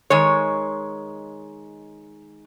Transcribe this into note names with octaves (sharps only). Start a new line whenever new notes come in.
D#3 G#3 C#5